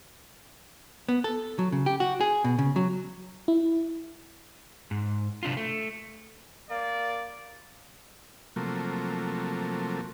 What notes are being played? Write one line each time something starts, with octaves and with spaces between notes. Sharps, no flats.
B3
A4
F#3
C#3
G4
F#4
G#4
B2
C#3
F#3
E4
G#2
C3 D4 F4
A3
A#3 D5
C3 F3 F#3 A3 A#3